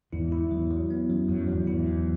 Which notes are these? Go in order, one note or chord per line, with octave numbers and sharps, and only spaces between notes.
E2 G#2 E4
E4
E2 F#3
F#3
B3
F#2 F#3
F#2 F#3
E2 G#2 F#3
E2 G#2 E4
F#3